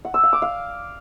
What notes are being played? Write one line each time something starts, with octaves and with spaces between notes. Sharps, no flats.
F#5
E6
F5
D6
F5